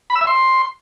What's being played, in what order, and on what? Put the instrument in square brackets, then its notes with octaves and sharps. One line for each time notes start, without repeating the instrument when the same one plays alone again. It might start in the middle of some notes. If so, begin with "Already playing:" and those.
[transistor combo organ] B5
E6
E5
C6